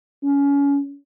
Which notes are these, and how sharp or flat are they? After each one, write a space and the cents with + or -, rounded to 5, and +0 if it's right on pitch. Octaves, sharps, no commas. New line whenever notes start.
C#4 +25